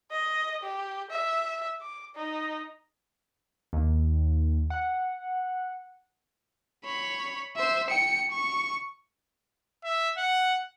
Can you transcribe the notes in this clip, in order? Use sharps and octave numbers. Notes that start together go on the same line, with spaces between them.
D#5
G4
E5
D6
D#4
D#2
F#5
C#5 B5
C5 E5
G5 C#7
C#6
E5
F#5